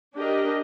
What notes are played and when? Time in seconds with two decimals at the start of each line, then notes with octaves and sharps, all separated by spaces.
0.16 D4 G4 A#4 D#5